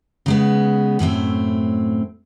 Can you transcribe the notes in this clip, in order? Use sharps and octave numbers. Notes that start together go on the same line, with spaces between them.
C#3 G#3 B3
F#2 A2 A3 C4